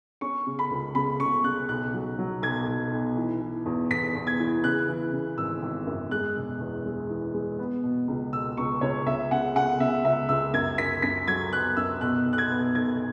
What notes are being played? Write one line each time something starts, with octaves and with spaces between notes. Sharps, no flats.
C#4 C#6
C#3
B5
C#2
C#3 B5
C#3 C#6
C#3 F#6
B1 F#6
F#3
F#3
B1 G#6
B1
B1
E3
E3
E2
E2 B6
E2
G#6
E3
C#3 F#6
E3
C#3
G#1 E6
G#1
F#2
G#3 F#6
E1
E2
G#3
E3
G#3
B3
B2
C#2
B2 E6
C#2 C#6
C#2 C#5
C#2 E5
C#3 F#5
C#3 F#5
C#3 E5
C#2 E5
C#2 E6
F#2 G#6
F#2 B6
F#2 B6
F#3 G#6
B3 F#6
F#2 E6
B2 F#6
B1
F#6
G#6
B3
B1 G#6